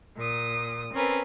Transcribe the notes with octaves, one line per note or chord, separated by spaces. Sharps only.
A#2 D#6
C4 C#4 A#4 B4